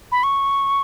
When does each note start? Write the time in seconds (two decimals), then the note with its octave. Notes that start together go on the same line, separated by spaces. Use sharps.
0.12 B5
0.23 C#6